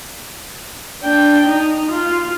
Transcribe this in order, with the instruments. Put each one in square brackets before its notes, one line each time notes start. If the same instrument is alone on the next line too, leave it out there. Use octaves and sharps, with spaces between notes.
[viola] D4 G5
D#4
F4